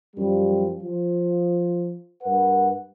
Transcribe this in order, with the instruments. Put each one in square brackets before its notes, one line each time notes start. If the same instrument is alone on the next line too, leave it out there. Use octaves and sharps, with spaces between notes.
[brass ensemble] F#2 F3 G3
F3
G2 A#4 B4 F#5